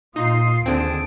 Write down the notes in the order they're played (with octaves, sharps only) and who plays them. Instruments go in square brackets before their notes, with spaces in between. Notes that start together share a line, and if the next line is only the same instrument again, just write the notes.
[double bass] A#2 [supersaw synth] D#4 [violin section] F4 C7 [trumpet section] C6 D#6
[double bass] D#2 [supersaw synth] D3 C4 [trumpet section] G#4 A5 [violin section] D7